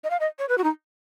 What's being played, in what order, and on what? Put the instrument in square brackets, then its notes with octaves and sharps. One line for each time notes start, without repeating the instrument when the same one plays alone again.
[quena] D#5
F5
D#5
C#5
B4
F#4
D#4